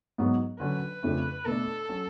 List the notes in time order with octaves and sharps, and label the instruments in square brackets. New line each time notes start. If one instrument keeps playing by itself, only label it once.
[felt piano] G#2 F#3 B3
[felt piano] D3 F#3 C#4 [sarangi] B4
[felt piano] F2 C#3 F3 A3 D4
[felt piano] B2 A3 D4 [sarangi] A4
[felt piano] F#3 C#4